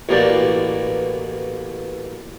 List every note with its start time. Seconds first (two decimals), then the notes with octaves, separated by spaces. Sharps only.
0.09 A1 B2 A#3 F#4 G4 D5